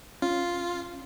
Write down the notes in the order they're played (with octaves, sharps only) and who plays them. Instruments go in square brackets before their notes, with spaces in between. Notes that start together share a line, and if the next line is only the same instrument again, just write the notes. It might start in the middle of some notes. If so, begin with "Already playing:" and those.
[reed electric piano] C#4 [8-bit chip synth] F4